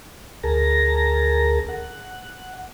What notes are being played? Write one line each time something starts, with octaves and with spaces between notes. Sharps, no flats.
D2 G#4 A#4 A5 A#5 A#6
F#5